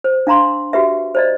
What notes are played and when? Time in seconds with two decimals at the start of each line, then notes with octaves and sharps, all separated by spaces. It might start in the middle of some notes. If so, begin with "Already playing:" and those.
0.04 C5
0.27 D4 F5 A#5 C6
0.73 F#4 G4 B4 E5
1.15 C5 D5 D#5